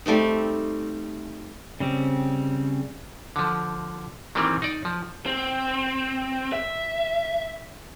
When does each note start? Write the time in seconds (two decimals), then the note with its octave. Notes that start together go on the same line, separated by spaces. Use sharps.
0.06 G3 A3 C4 D#4
1.80 C#3 G3 C4
3.36 D3 F3
4.35 D#3 E3 G3 A#3 C4
4.62 D#4 D5
4.85 F3
5.26 C4
6.53 E5